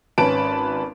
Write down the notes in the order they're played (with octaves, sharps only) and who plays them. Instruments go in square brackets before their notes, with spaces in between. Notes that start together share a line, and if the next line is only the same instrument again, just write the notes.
[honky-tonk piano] G#1 C#4 B4 A5 B5 D7